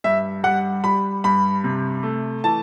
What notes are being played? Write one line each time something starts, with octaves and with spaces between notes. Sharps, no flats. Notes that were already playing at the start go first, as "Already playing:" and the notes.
G2 E5
G3 F#5
G3 B5
G2 B5
C3
A3
E3 A5